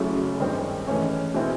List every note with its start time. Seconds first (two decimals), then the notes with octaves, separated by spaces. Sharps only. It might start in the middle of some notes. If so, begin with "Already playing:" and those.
Already playing: F#1 F#2 C#3 F#3 A3
0.40 G2 D#3 G#3 C4
0.87 G#2 E3 A3 C#4
1.34 B2 G#3 C4 E4